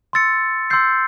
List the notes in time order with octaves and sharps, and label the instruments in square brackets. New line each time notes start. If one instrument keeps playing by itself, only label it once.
[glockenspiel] C6 E6 A6 C#7
C6 E6 G6 C7